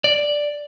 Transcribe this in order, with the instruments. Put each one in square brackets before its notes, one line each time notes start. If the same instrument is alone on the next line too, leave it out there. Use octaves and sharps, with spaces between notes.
[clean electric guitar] D5